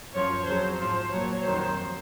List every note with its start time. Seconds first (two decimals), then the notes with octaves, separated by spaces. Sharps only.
0.14 F#2 F3 C#5
0.47 F2 C#3 F#3 C5
0.79 G#2 F3 C5
1.12 A#2 F#3 C#5
1.45 F2 D#3 F#3 C5